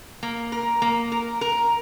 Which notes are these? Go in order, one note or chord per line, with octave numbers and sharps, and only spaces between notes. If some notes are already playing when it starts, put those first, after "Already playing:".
A#3
A#4
A#3
A#4
A#4